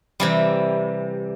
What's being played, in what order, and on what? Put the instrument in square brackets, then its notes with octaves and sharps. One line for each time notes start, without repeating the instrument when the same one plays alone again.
[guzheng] C3 E3 G3